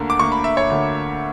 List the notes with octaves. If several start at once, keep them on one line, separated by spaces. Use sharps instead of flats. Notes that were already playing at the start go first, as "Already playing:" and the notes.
Already playing: D2 D3 A#3
D6
D2 D3 A#3 C#6
B5
E5
C#5
D2 D3 A#3